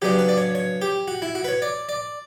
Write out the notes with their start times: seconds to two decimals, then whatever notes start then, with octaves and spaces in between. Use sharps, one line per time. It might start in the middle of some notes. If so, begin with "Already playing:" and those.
0.02 C#3 F#3 B3 D4 G4
0.19 B4
0.29 D5
0.38 C#5
0.55 C#5
0.82 G4
1.08 F#4
1.22 E4
1.35 F#4
1.44 B4
1.48 C#5
1.62 D5
1.89 D5